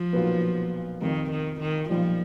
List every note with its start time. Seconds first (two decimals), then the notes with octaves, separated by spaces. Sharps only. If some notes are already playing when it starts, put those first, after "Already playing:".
Already playing: F3
0.13 B1 A#2 F#3 B3
1.01 F2 C3 D#3 F3
1.31 D#3
1.60 D#3
1.89 B1 A#2 F3 G3